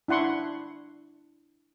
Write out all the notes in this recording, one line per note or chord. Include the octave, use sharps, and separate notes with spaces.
D4 E4 F#5 C6 C#6